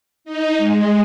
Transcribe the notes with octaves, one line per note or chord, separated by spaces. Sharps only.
D#4
G#3